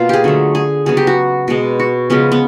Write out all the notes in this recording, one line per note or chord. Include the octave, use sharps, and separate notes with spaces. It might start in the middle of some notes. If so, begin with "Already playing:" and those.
Already playing: B2 A#3 F4
G4 G#4
D3 F#3 A3
G#4
C#3 F#3 B3 G#4
G4
F#4
B2 G#3 B3
F#4
C#3 F3 G#3 B3 C#4
B3